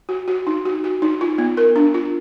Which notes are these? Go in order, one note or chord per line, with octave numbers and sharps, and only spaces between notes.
F#4
F#4
D#4
F#4
F#4
D#4
F4
B3
A#4
D4
F4